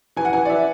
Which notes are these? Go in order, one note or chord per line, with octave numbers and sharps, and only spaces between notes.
E3 G#5
F#5
E3 G#5
D5
E3 E5